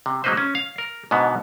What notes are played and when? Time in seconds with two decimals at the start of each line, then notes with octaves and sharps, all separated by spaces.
0.06 C3
0.24 F#3 G#3 A#3 D#4 B4 C5
0.37 C#4
0.55 F5
0.78 A#4
1.11 G#2 B2 D3 B3